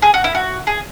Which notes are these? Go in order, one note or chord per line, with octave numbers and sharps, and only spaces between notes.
G#4
F#4
E4
F#4
G#4